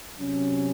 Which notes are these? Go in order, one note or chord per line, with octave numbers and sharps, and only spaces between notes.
C3 F#3 C#4